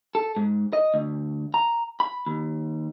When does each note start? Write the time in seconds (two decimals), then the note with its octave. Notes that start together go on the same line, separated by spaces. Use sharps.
0.15 A4
0.36 G#2
0.73 D#5
0.94 D2
1.54 A#5
2.00 B5
2.26 D#2